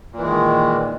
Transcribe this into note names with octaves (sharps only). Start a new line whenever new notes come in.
A#2 D#3 E3 G#3